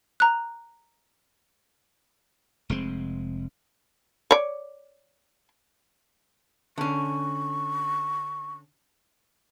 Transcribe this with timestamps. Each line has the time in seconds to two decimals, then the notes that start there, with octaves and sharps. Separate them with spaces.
0.20 A#5 F#6
2.70 F1 G#3 C4
4.31 C#5 D5
6.78 D3 C#4 C#6